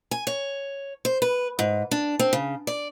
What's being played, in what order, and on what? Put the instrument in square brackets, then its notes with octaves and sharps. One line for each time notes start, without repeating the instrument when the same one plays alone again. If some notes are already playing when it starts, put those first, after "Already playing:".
[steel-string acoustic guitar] G#5
C#5
C5
B4
G#2
D4
C4
C#3
D5